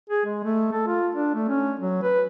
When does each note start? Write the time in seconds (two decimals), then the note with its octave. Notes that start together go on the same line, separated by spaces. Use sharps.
0.09 G#4
0.26 G#3
0.44 A3
0.72 A4
0.87 F4
1.15 D4
1.35 A3
1.49 C#4
1.79 F#3
2.03 B4